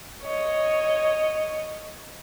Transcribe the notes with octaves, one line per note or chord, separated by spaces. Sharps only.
C#5 D#5